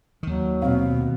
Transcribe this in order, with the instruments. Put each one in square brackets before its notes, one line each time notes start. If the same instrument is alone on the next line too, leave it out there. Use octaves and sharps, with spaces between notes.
[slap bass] D#2 D#3 [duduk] F#3
[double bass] B2 [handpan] C4 F5